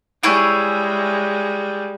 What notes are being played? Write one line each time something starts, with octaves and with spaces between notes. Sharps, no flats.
G3 G#3 E4 G#4 C#5